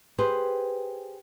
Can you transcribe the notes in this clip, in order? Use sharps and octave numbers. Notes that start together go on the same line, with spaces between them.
G4 G#4 B4 C5